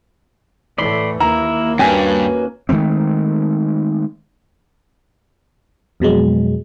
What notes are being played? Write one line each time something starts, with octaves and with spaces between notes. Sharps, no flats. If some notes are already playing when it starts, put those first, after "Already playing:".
A2 E3 A3 D5 B5 C6
D#2 A#3 E4 A#5
G2 C#4 F#4 B4 G#5
D#3 G#3 A3 C4
F2 B2 F#3 G#3